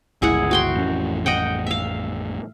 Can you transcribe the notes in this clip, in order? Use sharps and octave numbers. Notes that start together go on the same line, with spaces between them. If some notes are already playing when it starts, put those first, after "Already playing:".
G1 C#2 E4 G#4 F#5
F#4 G5 C6
A1 F2 C#4
D#5 F#5 G5
E5 F5